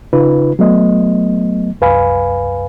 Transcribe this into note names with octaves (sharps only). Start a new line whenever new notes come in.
C#3 D#4 F4 B4
F#3 A3 B3 D#5
C2 F#2 B4 F5 G#5 B5